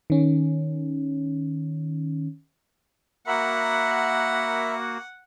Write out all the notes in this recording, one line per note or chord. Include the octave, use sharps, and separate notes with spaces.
D#3 C#4
A#3 F#4 A#4 E5 F#5 B5